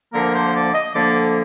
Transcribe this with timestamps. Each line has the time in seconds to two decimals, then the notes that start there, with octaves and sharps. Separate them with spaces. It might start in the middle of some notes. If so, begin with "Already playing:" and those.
0.13 D2 D3 F3 A#3 A#4
0.34 C5
0.54 D5
0.74 D#5
0.95 D2 D3 F3 A#3 D5